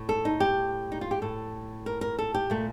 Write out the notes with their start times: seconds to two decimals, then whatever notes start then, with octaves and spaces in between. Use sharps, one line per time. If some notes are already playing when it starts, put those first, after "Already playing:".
Already playing: A2
0.09 A4
0.25 D#4
0.40 G4
0.92 D#4
1.01 F4
1.11 G4
1.22 A2 A4
1.86 A#4
2.01 A#4
2.19 A4
2.34 G4
2.50 A#2 A3